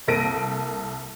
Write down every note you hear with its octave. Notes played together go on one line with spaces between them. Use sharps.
C2 A#3 A4 A#6 D7 D#7